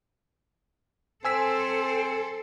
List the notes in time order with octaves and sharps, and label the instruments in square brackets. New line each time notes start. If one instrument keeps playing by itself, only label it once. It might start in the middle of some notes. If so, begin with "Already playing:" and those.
[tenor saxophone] C4 [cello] A4 C5 [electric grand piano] G#5 E6 B6